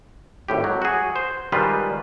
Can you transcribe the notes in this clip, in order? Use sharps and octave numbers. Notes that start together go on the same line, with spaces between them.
G#1 A2 G4
F#3
F#4 G#4
C5
D#3 G3 G#3 F4 B4 C5